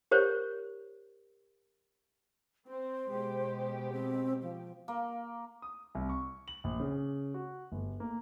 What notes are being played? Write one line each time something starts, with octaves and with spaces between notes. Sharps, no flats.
G4 A#4 C5 C#5
C4 C5
B2 G#3 G4
C4
F3
A#3
D#6
C2
C#6
F#7
A#1
C#3
F#4
G1
A#3